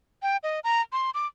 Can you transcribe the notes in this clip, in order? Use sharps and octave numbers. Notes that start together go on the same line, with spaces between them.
G5
D#5
A#5
C6
D6